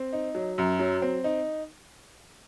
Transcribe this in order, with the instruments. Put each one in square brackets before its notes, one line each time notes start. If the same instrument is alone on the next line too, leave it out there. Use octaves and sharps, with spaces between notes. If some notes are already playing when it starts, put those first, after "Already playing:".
Already playing: [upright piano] C4
D#4
F#3
F#2
F#3
C4
D#4